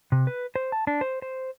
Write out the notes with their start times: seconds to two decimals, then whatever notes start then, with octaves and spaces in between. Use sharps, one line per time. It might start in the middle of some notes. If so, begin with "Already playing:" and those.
0.12 C3
0.27 B4
0.56 C5
0.72 A5
0.87 D4
1.01 C5
1.22 C5